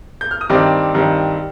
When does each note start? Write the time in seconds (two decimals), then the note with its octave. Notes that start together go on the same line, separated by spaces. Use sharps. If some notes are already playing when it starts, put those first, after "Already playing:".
0.21 G6
0.31 F6
0.41 D#6
0.49 G2 D#3 G3 C4 D5 D6
0.94 G2 D#3 G3 C4